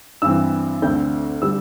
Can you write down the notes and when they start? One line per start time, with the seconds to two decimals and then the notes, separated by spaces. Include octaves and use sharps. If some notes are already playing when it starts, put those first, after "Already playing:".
0.22 G2 E3 C4 E6
0.82 D2 D3 C4 G6
1.42 D3 G3 E6